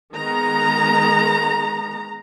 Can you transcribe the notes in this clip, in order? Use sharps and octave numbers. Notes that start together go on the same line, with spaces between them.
D#3 G#3 B3 A#5